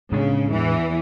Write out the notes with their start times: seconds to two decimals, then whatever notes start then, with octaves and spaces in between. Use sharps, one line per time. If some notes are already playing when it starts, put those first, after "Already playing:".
0.12 A2 C#3 G#3 B3 D4
0.51 E2 E3